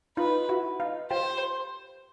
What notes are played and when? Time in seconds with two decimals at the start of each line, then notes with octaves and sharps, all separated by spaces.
0.17 D#4 F4 B4
0.49 E4 F#4
0.80 D#4 F4
1.10 F4 G4 C5